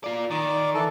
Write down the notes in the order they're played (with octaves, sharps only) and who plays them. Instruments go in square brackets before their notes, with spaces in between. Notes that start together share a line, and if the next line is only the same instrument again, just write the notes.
[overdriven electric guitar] F4 D5
[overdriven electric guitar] D#3 [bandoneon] D5 D6
[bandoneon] E3 A4 A5